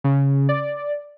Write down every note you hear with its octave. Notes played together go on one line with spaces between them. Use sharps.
C#3
D5